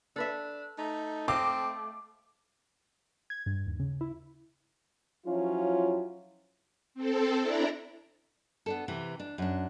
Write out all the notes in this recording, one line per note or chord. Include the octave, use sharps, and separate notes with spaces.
D4 A4 B4 E5
A3 D#4
C4 D#5 F5 D6
G#6
G2
D#2
C#3
E4
F3 F#3 C#4 E4 F4
C4 A4
D4 E4 D5 A#5
B3 D4 A4
C3 E3
D4
F#2 D4